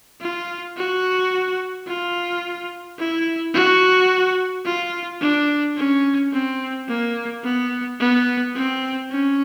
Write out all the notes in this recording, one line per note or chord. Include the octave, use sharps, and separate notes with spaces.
F4
F#4
F4
E4
F#4
F4
D4
C#4
C4
A#3
B3
B3
C4
C#4